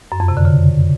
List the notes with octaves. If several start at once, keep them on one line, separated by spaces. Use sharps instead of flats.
F#2
F2
C3
D3
C#3